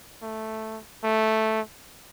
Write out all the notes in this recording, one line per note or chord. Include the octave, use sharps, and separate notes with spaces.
A3
A3